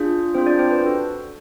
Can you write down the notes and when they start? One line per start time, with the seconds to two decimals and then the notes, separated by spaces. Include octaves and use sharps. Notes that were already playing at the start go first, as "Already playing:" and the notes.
Already playing: D4 F4 G#4
0.34 C4 D4 C5
0.38 F4 G#4
0.46 D4 D5
0.59 C4 C5
0.71 B4
0.82 D4 F#4 A4